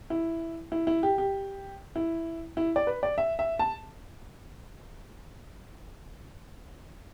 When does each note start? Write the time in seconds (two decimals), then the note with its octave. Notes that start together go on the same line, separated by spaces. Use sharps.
0.10 E4
0.72 E4
0.87 E4
1.03 G4
1.18 G4
1.96 E4
2.57 E4
2.76 D5
2.87 B4
3.03 D5
3.18 E5
3.39 E5
3.59 A5